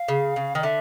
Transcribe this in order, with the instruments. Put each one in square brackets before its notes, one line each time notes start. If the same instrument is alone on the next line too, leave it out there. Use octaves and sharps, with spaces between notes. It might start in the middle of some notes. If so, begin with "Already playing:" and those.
Already playing: [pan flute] F5
[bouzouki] C#3
C#3
D#3
[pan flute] D#5
[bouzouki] D3 [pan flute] E5